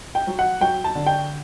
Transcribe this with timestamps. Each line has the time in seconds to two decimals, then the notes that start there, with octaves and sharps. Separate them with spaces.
0.15 G5
0.27 F#3
0.39 F#5
0.61 F#3 G5
0.84 A5
0.95 D3
1.06 G5